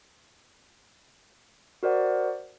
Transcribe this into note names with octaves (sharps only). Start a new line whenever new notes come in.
F#4 A#4 C5 D5 F#5